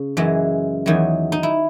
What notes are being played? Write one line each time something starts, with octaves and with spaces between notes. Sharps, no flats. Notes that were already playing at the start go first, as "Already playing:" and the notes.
Already playing: C#3
F#2 E3 G#3
E2 D#3 F#3
D#4
E4